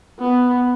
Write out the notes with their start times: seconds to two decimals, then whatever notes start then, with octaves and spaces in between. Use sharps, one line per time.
0.19 B3